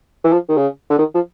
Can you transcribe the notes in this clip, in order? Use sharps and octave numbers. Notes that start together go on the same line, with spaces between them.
E3
F3
D#3
C#3
D3
D#3
F3